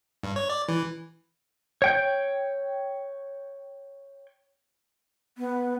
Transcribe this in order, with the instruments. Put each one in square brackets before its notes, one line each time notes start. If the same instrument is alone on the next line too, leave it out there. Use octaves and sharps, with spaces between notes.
[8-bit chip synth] G2
C#5
D5
E3
[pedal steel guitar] C#5 G5 G6
[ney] B3